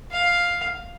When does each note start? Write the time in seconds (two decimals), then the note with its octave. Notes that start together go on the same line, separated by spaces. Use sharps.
0.12 F5